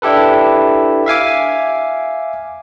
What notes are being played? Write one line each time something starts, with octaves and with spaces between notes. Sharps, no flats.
D4 E4 G4 A4 B4
E5 F5 G#5 D6